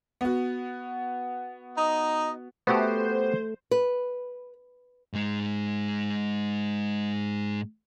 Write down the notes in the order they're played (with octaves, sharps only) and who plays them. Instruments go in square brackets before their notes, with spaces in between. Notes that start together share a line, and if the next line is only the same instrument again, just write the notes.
[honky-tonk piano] B3 F#4
[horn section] D#4 D#5
[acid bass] A3 [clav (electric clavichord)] B3 F#4 G4 [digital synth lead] C5
[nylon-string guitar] B4
[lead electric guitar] G#2 G#3